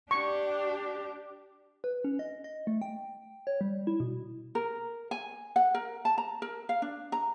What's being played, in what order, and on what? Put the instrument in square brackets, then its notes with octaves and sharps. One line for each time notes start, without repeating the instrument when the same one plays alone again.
[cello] D4 G4 [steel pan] C#6
[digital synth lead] B4
C#4
D#5
D#5
A3
G5
C#5
G3
E4
B2
[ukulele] A#4
G#5
F#5
A#4
A5
A#5
A#4
F5
D4
A#5